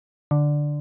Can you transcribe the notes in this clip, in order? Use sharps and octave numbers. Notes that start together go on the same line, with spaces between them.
D3